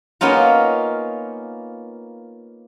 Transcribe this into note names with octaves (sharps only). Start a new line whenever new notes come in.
A#3 B3 C#4 D#4 F4